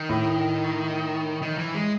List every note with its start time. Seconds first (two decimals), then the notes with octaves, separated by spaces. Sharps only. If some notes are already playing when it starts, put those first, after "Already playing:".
Already playing: D#3
0.09 A2
1.42 D#3
1.58 E3
1.75 G#3